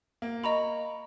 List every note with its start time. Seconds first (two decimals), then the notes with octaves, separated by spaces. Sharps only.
0.22 A#3
0.44 D#5 A#5 B5 C#6